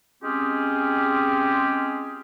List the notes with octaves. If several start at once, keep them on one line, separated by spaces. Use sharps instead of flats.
G#3 C4 C#4 F4 G4 G#4